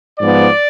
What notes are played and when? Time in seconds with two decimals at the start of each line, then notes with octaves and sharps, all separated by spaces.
0.20 G#2 F3 B3 D5